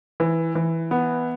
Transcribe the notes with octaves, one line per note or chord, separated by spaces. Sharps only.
E3
E3
B3